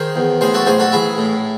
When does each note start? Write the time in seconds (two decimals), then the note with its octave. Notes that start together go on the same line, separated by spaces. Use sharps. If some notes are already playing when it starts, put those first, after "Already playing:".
Already playing: D#3 G#4 C5
0.16 E2
0.41 A2 G#4 C5
0.54 F#4 A4
0.66 A1 G#4 C5
0.80 F#4 A4
0.92 A1 E4 G#4
1.18 A2